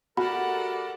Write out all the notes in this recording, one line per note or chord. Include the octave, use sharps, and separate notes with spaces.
A3 F#4 G4 A4 A#4 D5 F#5 B5